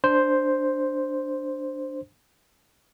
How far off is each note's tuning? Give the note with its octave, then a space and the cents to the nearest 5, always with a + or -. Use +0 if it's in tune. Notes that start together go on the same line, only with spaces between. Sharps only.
D4 +0 C5 +0